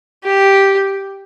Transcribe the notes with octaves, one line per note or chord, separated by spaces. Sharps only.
G4